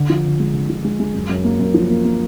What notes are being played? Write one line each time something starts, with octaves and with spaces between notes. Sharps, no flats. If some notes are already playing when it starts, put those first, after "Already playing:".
Already playing: D3
F3
D3
G#3
D3
F3
G#3
G#3
F#2
F#2
A#3
F#2
F3
A#3
A#3